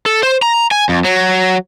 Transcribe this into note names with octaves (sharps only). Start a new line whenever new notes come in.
A4
C5
A#5
G#5
F2
F#3